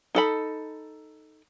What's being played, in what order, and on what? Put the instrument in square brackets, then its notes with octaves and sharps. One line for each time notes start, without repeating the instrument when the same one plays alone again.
[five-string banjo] D#4 A4 B5